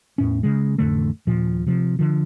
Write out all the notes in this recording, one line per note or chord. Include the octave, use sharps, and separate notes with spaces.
E2 A2 C#4
C#3 G#3
A1 F2 D3 A3
D#1 A#2 F3
C3 F3
D3 F3